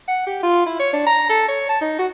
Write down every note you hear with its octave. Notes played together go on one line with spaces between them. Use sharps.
F#5
G4
F4
E4
C#5
D4
A#5
A4
C#5
A5
D#4
F#4